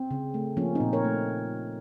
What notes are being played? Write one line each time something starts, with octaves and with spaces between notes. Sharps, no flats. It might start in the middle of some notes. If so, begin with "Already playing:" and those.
Already playing: C4
C#3
A3
F3 A#3 C#4
A#2 C4 D#4
A#4 C#5
A3